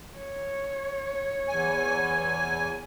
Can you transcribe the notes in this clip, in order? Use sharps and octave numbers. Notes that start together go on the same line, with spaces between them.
C#5
E2 G#5